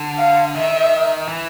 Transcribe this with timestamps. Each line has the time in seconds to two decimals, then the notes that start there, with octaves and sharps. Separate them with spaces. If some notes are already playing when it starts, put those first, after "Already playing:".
Already playing: D3
0.18 F5
0.55 D#3 E5
1.28 E3